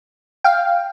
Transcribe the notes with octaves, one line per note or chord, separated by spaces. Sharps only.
F5 G5